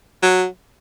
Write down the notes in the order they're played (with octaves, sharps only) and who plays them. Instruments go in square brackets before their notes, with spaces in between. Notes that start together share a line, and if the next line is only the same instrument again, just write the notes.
[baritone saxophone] F#3